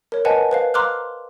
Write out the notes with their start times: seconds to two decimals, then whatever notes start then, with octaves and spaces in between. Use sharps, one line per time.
0.12 A#4 C#5
0.25 B4 C5 D#5 F#5 G#5 A5
0.51 B4 C5 F5
0.74 F5 A#5 C6 D6 F6 F#6